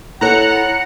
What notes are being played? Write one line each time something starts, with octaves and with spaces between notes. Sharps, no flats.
E4 A4 C#5 F#5 A#5 F#6 C#7